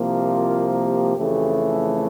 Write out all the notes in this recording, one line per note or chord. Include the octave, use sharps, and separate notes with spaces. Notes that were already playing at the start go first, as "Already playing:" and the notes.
Already playing: C2 C3 F3 A#3
F4
G4
F2 C#3 E3 A3